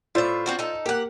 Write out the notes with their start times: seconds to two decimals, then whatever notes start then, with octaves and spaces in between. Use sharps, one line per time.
0.15 A2 F4 C5 D5 E5
0.46 C4 D4 F#4
0.59 D#4 A4
0.86 A#3 G4 F#5